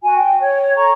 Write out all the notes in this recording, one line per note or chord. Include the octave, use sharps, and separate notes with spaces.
F#4 G#5
G5
C#5
A4 A#5 C#6